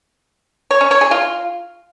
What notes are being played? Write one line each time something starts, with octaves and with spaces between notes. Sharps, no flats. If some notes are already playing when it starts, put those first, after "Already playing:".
C#5
C#4
C#5
G#4
F4